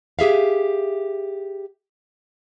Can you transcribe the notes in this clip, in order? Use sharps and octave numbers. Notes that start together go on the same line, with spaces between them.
G4 G#4 E5 F5